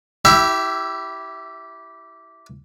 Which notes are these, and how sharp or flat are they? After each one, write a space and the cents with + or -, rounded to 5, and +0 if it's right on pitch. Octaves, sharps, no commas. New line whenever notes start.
E4 -5 G4 -15 E5 +25